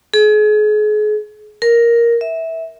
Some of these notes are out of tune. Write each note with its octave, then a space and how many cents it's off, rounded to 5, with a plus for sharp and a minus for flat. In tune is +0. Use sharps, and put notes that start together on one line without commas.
G#4 +35
A#4 +5
E5 -15